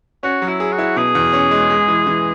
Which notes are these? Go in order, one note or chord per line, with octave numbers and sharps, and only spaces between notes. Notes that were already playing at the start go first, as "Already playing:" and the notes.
C#4 F#4
F#3
E4
G#4
F#4
E4
B2 G#4
E2
C#4
G#3
G#3
E3
E3